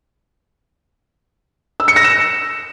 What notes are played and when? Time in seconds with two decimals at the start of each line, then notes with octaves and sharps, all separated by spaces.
1.80 E6
1.88 C#7
1.96 A#6
2.04 E7